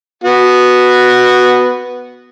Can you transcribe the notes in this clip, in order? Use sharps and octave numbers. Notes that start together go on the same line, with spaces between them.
B3 F#4